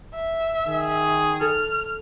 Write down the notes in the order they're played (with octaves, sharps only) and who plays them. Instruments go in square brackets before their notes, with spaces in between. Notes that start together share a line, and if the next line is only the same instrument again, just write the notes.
[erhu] E5
[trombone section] D#3 [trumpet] G#4
[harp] A4 [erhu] F6